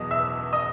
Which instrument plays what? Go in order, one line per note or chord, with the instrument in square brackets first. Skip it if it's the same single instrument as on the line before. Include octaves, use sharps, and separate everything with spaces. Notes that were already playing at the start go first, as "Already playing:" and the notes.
Already playing: [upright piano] E2 B2 F#3 D#5
E5 E6
D#5 D#6